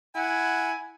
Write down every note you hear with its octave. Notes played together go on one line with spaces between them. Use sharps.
E4 F#5 G#5